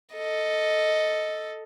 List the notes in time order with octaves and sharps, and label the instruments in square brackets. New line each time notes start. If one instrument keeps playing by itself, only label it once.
[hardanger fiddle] A4 D#5